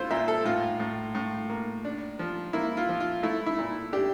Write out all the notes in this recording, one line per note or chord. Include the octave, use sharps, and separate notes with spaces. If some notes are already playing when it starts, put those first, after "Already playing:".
Already playing: A3 E4 F4 C5
A#2 E5
A4
A2 F4
A2
A2
A#3
D4
F3
A#3 E4
F4
F3
F4
A3 E4
E4
A#2
D4 G4